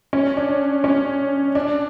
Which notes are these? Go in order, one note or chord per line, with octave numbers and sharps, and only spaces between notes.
C#4
D4
C#4
D4